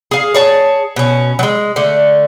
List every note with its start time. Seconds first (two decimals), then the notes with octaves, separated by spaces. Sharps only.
0.11 G#4 F5
0.34 G#4 C#5 A5
0.96 B2 C#4
1.39 F#3 G#3
1.76 D3 A3